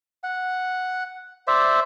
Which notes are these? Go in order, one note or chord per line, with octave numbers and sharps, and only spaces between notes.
F#5
C5 D5 E5